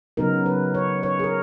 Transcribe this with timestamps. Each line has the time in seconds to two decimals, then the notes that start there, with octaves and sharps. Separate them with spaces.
0.17 C#3 F#3 B3 D#4 A#4
0.46 B4
0.74 C#5
1.03 C#5
1.19 G#4
1.24 A#4